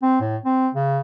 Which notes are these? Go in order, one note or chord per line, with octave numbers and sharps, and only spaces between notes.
C4
A2
C4
C#3